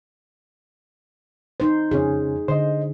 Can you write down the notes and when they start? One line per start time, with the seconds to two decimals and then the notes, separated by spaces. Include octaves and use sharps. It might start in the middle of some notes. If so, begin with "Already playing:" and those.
1.60 D#4 C5
1.91 F2 C#3 C#4 G#4
2.48 D3 C5 D#5